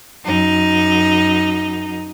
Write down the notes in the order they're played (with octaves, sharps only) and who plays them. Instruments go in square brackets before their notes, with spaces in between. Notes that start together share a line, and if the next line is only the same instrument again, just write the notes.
[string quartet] F#2 D#4